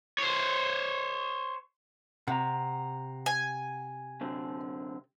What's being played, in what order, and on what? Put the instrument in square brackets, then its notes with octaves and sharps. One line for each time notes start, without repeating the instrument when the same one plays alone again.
[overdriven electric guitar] C5 C#5
[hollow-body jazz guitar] C3 [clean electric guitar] F#5 A#5
[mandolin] G#5
[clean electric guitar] F#2 D3 C4